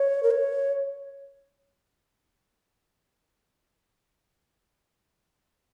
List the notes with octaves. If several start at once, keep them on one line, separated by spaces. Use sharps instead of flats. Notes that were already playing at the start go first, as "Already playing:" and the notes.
Already playing: C#5
A#4
C#5